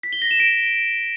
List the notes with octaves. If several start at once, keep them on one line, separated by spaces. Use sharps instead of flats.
B6
G7
A#6
E7
D7